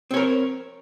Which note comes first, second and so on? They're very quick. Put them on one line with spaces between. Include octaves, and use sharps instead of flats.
C4 C#5 A#4